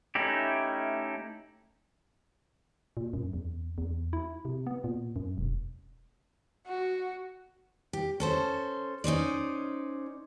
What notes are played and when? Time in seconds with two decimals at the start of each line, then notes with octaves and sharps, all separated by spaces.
0.15 A3 C#4 D#4 E4 G4
2.97 A#2
3.13 F#2
3.33 E2
3.78 E2
4.13 E4
4.45 C3
4.67 B3
4.84 A#2
5.16 F#2
5.38 E1
6.66 F#4
7.93 G4
8.20 C#4 A4 C5
9.04 C#4 D#4 C5 D5